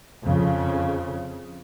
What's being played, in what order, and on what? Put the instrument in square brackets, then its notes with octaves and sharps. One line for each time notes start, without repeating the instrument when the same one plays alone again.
[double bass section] F2 C#3